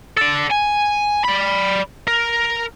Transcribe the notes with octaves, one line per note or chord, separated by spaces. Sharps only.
A4 D5
G#5
D5 B5
A#4